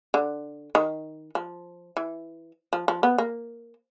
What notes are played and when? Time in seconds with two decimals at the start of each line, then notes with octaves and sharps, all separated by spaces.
0.14 D3
0.75 D#3
1.35 F3
1.97 E3
2.73 F3
2.88 F3
3.03 B3
3.18 A#3